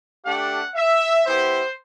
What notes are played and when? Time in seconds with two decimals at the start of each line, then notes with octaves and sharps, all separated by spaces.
0.25 A3 D4 G4 F#5
0.75 E5
1.25 B3 E4 G4 C5